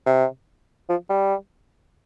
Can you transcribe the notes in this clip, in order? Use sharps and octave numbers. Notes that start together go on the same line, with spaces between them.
C3
F3
G3